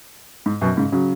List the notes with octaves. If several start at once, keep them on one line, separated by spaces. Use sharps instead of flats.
G#2
F#2 B2
G#2 C#3
C#3 F#3